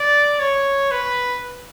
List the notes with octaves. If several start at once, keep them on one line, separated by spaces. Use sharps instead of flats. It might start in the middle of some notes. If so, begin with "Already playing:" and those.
Already playing: D5
C#5
B4